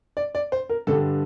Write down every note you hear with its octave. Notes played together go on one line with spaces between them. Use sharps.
D5
D5
C5
A#4
G2 D3 G3 A4